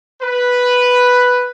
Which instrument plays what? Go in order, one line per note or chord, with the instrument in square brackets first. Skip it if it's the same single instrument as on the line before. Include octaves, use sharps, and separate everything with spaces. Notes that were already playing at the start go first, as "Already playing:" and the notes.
[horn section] B4